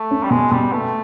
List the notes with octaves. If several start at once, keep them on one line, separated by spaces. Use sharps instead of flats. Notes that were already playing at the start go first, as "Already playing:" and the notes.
Already playing: A3
C#4
G3
B2 G#3
B2 G3
A3 B3